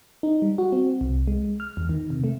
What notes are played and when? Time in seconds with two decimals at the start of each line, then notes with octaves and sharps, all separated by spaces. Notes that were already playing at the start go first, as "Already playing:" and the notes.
0.23 D#4
0.42 G3
0.58 F#4
0.72 C4
1.01 C2
1.28 G#3
1.60 F6
1.77 E2
1.89 D#3
2.10 C3
2.24 A3